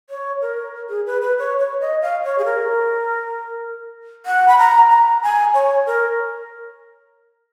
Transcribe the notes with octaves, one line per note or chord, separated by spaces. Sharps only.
C#5
A#4
G#4
B4
B4
C#5
C#5
D#5
F5
C#5
G#4
A#4
F#5
B5
A#5
A#5
G#5
C#5
A#4